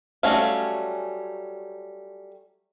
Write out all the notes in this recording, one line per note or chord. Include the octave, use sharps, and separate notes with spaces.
F#3 G3 A3 C#4 F5